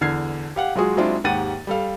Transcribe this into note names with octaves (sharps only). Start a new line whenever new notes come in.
E2 D3 F6 G#6 C7
G4 F5 F#5
F#3 G#3 F4 F#4 G#4
F#3 G#3 C4 D4 E4 F4
D#2 G#2 G4 F#5 A6 D#7
G3 A4 F5